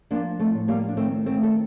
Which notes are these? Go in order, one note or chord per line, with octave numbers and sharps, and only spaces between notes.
F3 A#3 D4
A3 C4
A2
G3 A#3
D4
D#3 A3 C4
A3 C4
D#3 A4